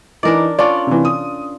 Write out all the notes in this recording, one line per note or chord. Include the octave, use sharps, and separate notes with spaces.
E3 D4 D#4 A#4 D5
C#4 D4 F4 D5
C3 E3
D#6